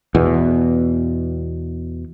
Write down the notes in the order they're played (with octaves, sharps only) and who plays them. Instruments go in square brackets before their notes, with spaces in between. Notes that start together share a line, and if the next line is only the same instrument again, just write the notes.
[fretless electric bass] E2 B2